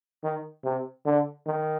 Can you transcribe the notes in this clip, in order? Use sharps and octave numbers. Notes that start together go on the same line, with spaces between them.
D#3
C3
D3
D#3